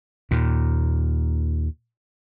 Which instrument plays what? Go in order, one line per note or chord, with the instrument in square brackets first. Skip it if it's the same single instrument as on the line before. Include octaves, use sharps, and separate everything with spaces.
[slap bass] D#2 A#2